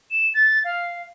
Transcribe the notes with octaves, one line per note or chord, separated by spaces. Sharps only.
E7
A6
F5